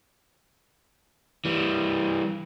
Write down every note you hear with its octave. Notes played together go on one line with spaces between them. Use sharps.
E3 G3